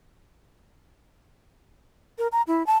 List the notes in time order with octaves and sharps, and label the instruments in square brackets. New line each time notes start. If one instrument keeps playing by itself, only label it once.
[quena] A#4
A#5
E4
A5